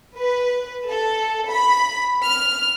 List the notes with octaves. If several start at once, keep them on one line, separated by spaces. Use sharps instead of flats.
B4
A4
B5
F6